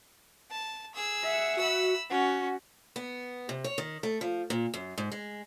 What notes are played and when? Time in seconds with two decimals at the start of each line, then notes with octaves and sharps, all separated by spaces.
0.50 A5
0.95 G#4 E6
1.23 E5 F#5
1.57 F#4 B5 E6
2.10 C#4 F#4 F#5
2.96 B3
3.49 C3
3.64 C#5
3.78 D#3
4.03 A3
4.21 F3
4.50 A#2
4.74 F#2
4.98 G#2
5.12 G#3